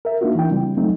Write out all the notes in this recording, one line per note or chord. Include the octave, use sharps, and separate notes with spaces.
A#4 E5
A#3 D4 D#4 F4 F#4
E3 D4 E4 G5
C#3 G3 C4
F#3 A3 C4 D#4